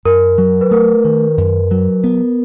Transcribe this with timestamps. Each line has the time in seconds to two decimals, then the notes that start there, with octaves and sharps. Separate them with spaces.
0.05 F#2 A#4
0.38 F#3
0.61 B4
0.71 A3 A#4
1.05 D#3
1.38 F#2
1.71 F#3
2.04 B3